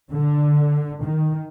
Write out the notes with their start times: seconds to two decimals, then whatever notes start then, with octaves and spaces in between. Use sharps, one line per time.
0.11 D3
1.03 D#3